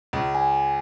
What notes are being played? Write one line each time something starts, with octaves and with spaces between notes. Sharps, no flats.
C#2
G#5